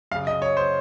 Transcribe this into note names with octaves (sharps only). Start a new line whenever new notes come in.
F#2 C#3 F5
D#5
C#5
C5